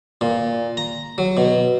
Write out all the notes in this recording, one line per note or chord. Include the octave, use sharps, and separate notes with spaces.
A#2
A#5
F#3
B2